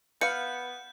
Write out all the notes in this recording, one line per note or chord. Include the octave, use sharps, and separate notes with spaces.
B3 B4 F5 G6 C#7